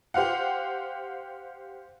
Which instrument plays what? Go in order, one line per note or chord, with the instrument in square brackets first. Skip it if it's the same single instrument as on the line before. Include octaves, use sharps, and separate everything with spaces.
[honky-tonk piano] G4 C5 F5 F#5